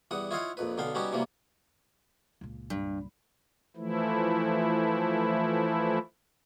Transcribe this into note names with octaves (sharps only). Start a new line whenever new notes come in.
E2 G3 F#5 D#6
E4 F4 C#5 D#5 F5 F#5
A#1 F2 B4
B1 D3 B3 F5 G5
G3 B3 C#4 D#4 F#4 G4
C3 E3 F#3 G3 A#3
C#2 A#2
G2
E3 F3 A3 E4